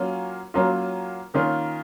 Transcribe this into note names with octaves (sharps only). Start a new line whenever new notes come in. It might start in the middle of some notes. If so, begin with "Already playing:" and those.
Already playing: F#3 A#3 C#4 F4
F#3 A#3 C#4 F4
D#3 A#3 C#4 F4